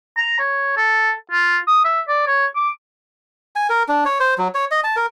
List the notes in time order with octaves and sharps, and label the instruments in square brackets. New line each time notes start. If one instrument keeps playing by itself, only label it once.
[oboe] A#5
C#5
A4
F4
D#6
E5
D5
C#5
D6
[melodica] G#5
A#4
D4
C#5
C5
F#3
C#5
D#5
A5
A#4